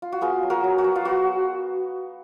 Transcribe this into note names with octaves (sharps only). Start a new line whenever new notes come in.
F4
F#4
B3 F4 G#4
F#3
F#4 A#4
F#3
F#4
F#3
F4
B3 F#4